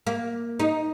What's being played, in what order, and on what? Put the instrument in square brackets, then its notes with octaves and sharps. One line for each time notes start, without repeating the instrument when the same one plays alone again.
[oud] A#3
D#4